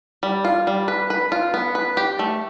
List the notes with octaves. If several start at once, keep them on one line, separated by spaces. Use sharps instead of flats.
G3
F4
G3
B4
B4
F4
B3
B4
G4
A3